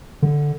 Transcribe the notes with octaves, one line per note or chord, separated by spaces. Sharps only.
D3